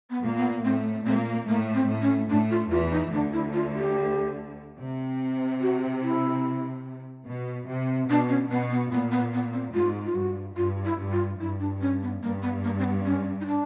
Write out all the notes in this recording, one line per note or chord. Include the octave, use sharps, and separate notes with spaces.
B3
A#2 A#3
B3
A2 A3 C4
A#2 A#3 C4
A2 A3 A#3
C4
A2 A3
C#4
A2 A3 D4
F4
E2 E3 F4
D#4
D2 D3 D4
E4
F4
G4
C3
F#4
E4
B2
C3
B2 D4
C#4
B2 B3
B3
A#2 B3
B3
B3
C4
G#2 F4
F4
G2 F#4
G2 F4
E4
G2
F4
G2 E4
D4
C#4
B3
G2 A#3
B3
A#3
C4
B3
C#4
D#4
D4